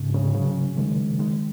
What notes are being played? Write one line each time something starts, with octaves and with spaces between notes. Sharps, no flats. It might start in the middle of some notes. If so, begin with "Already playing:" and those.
Already playing: G#2 C#3
G#2 C#3
C#3 F#3
D#3 G#3
D#3 G#3